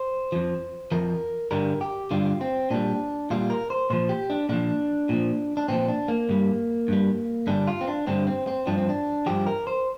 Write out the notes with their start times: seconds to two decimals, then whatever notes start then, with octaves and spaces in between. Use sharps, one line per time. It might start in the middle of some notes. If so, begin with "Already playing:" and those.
Already playing: C5
0.32 F2 F3
0.92 F2 F3 A#4
1.51 G2 D3 G3 A#4
1.81 G4
2.11 G2 D3 G3 F4
2.41 C4
2.71 A#2 G3 D4
3.30 A#2 G3 F4
3.50 A#4
3.70 C5
3.90 A#2 F3 C5
4.09 G4
4.30 D4
4.49 A#2 F3 D4
5.09 A#2 F3
5.57 D4
5.68 A#2 F3 C4
5.88 D4
6.08 A#3
6.29 G2 G3
6.88 G2 G3
7.47 G2 D3 G3 D4
7.67 F4
7.81 C4
7.88 D4
8.07 G2 D3 G3 C4
8.27 C4
8.47 C4
8.67 G2 F3 D4
8.78 C4
8.89 D4
9.26 G2 F3 G4
9.46 A#4
9.67 C5